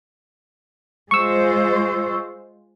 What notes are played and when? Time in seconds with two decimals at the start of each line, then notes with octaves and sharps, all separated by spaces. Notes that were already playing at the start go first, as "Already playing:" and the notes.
1.11 G#3 F4 C5 C#6 E6